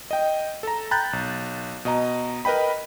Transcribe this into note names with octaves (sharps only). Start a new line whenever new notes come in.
D#5 G5
A4 A#5
G5 A#5 B5 F#6 G6 A6
B1
B2 D#5 A#5
A#4 B4 D#5 G5 B5